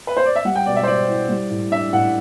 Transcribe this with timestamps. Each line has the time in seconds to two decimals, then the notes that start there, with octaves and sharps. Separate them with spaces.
0.07 B4
0.17 C5
0.26 D5
0.36 E5
0.45 G3 F#5
0.55 G5
0.66 B2 D5
0.76 E5
0.83 C5
0.87 C4 D5
1.08 E4
1.29 G3
1.50 A2
1.71 D4 E5
1.93 A2 F#5